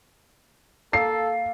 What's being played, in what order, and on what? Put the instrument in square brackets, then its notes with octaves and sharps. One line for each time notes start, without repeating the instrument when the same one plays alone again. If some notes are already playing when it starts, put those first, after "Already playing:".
[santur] A#3 [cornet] A4 [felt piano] C7